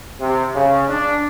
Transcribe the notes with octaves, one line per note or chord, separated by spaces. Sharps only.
C3
C#3
D4